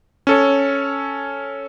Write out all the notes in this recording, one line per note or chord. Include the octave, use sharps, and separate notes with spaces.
C#4 A4 C#5